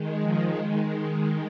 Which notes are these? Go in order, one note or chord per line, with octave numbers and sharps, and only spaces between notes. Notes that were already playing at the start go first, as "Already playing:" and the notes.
Already playing: D#3 G#3
F3
D#3 G#3